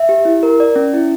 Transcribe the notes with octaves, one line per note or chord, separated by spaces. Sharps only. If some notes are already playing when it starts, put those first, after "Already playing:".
Already playing: E5
G4
E4
A#4
D5
C#4
E4